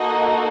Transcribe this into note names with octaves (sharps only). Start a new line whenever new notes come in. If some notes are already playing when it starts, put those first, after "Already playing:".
Already playing: A#3 D#4 F#4 A4 D#5